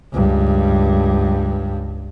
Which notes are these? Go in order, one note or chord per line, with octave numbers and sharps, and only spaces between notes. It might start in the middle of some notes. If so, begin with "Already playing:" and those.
C#2 G2